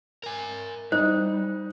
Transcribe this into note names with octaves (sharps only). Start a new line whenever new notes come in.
A#4 G#5
G3 D#4 C5